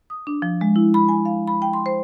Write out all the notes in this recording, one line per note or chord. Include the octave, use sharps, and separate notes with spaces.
D#6
D4
F3
G#3
E4
B5
G#5
F5
B5
G5
C6
C5